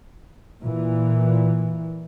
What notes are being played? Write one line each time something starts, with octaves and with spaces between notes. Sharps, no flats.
A#2 E3